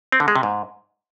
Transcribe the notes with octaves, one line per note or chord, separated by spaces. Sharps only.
C4
D3
G#3
C3
G#2